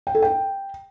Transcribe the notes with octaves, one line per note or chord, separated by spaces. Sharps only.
G5
A4
G5